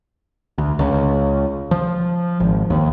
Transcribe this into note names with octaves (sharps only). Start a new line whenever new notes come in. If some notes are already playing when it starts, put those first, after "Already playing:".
D2
C#2
F3
G#1
D#2